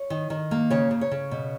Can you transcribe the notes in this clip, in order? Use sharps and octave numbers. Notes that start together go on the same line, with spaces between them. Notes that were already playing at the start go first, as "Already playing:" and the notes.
Already playing: C#5
D#3
D#3
A#3
C#3 C#5
C#3
C#5
C#3
B2